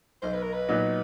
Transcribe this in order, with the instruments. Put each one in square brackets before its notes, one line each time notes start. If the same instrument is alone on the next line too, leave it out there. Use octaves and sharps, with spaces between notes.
[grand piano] B1 [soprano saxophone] C5
[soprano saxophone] B4
A#4
B4
[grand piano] A#2 F#3 B3 D#4